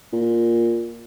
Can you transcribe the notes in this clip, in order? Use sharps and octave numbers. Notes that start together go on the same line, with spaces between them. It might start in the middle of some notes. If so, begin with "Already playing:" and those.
A#2